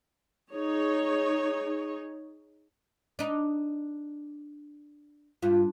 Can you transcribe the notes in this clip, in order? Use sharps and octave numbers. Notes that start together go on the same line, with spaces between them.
D#4 G#4 C#5
D4 D#4
G2 F4